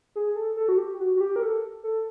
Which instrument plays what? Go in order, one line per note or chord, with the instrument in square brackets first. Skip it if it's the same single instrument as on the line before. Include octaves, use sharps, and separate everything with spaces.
[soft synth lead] G#4
A4
A4
F#4
G4
F#4
F#4
G4
A#4
A4
A4